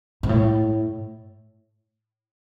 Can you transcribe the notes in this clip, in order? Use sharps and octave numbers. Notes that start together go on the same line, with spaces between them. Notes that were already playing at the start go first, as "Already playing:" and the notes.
G#2
A2